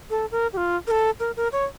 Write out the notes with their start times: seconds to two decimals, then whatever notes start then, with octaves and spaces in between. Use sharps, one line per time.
0.10 A4
0.31 A#4
0.53 G4
0.57 F4
0.87 A#4
0.91 A4
1.20 A#4
1.36 A#4
1.52 C#5